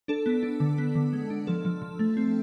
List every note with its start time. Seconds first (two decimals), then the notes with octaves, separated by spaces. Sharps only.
0.08 D4 A4
0.26 B3
0.43 D4
0.60 D3
0.78 B3
0.95 D3
1.13 G#3
1.30 D4
1.47 F3 A4
1.65 F3
1.82 F3
1.99 A3
2.17 C4